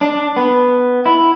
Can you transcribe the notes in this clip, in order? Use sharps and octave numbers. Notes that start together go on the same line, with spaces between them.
D4
B3
E4